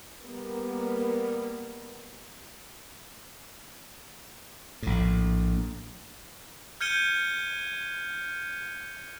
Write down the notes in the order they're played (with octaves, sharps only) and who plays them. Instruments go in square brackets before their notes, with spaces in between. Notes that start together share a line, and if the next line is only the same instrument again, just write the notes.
[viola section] G3 A#3 B3
[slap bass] A#1 A2
[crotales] F6 G6 G#6 C#7 D#7 G7